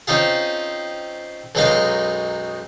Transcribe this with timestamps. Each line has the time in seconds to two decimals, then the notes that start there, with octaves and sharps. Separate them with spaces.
0.07 C4 C#4 D#4 F4 G#4
1.55 B1 F#2 G#3 D#4 D#5 F5